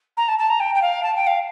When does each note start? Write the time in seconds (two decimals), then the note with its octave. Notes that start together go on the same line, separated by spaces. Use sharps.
0.17 A#5
0.28 A5
0.38 A5
0.50 A#5
0.60 G5
0.75 G5
0.82 F5
1.03 A5
1.15 G5
1.27 F5